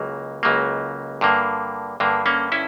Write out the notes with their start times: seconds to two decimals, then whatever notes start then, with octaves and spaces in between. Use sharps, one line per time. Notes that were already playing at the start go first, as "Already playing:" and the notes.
Already playing: C#2 C#3 F#3 A#3
0.43 C#2 C#3 F#3 A#3
1.21 G2 D3 A#3
2.00 G2 D3 A#3
2.26 A#3 C#4
2.52 C#4 E4